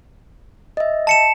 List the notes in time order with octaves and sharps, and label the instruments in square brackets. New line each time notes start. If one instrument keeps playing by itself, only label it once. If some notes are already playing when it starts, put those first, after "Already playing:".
[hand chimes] D#5 E5
[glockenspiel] A5 C#7 E7